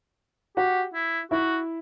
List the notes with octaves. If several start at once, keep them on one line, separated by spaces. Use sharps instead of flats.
F#4 G4 F#5
E4
E4 F#4 E5